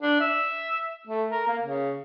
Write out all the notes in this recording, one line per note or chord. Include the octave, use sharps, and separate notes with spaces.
D4
E5
A3
A#4
A#3
C#3